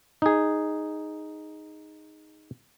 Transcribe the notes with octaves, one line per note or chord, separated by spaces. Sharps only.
D#4 G#4